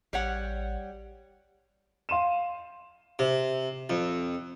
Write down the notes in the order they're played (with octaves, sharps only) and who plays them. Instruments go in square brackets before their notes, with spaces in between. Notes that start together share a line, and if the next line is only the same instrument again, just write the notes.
[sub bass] A1 [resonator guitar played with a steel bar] G3 C#5 F#5
[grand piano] F5 C6 D#7 E7
[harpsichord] C3
F2